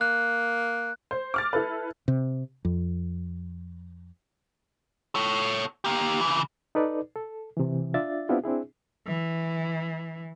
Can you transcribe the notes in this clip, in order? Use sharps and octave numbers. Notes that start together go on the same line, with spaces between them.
A#3 F#6
C5
D6 F6 A6
E4 A4 B4
C3
F2
A4 C#5
A#3 G4
C#3 E3
D#4 A4 B4 D5
A4
C3 E3
D4 F4 D5 E5 A6
B3 C4 D4 E4 F4 G4
C4 D4 E4 G#4
E3